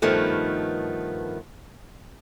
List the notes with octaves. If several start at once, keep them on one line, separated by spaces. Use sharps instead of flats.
G2 D#3 F3 A3 B3